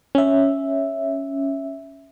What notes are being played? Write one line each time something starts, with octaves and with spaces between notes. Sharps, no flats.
C#4 E5